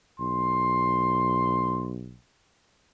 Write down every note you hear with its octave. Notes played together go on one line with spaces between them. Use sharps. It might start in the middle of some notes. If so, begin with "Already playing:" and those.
B1 C6